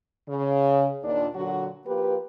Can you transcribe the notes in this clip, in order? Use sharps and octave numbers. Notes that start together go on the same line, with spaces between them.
C#3
D#2 A#2 D4
A#2 D3 F#3 F#4
F3 A#3 G4 B4